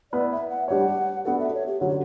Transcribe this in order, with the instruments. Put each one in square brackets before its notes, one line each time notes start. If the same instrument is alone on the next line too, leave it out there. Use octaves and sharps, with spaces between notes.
[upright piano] B3 E4 B4 [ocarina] D5
[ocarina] E5
F#5
[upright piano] G3 D4 G4 C#5 [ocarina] F#5
[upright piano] B3 D4 F#4 A4 [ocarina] F#5
[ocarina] E5
C#5
G4
[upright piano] D3 F#3 C#4 [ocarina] F#4
[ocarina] G4